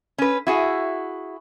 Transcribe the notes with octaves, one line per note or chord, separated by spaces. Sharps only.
C#4 B4
E4 F#4 G#4